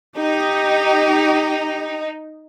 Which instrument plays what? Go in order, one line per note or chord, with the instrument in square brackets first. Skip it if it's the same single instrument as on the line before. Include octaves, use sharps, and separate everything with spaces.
[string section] D#4 [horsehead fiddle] G4